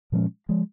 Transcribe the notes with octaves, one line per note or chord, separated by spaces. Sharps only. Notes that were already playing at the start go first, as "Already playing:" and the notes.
A#2 F3 G#3 C#4
F3 G#3